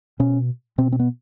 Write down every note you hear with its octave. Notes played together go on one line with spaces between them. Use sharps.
B2 C#4
B2 C4
C4
B3